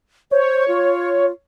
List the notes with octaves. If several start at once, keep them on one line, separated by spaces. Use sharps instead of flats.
C5 C#5
F4